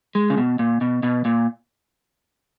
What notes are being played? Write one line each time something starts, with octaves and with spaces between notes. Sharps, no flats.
G#3
C#3
B2
A#2
B2
B2
A#2